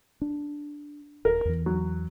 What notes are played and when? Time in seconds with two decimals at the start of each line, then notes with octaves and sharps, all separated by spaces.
0.22 D4
1.25 D#1 A#4
1.45 E2 E3
1.66 F#3